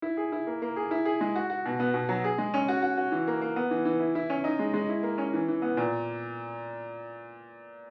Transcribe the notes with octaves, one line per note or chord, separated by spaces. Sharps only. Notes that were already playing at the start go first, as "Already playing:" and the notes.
E4
G#4
E4
A#3
A#3
G#4
E4
G#4
G#3
F#4
F#4
B2
B3
B2
F#3
G#4
G#3
C#4
F#4
F#4
F#4
E3
A#3
A#3
B3
E3
E3
E4
E4
C#4
D#4
G#3
G#3
E4
A#3
C#4
E3
E3
B3
A#2